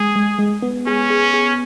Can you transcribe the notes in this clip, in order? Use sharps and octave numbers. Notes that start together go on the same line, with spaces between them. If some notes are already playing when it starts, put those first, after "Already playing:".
Already playing: G#3 G#4
G#3
G#3
B3
C#4 G#4
G#4
G#4